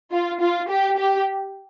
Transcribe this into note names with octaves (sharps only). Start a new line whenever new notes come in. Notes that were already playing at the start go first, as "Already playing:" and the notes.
F4
F4
G4
G4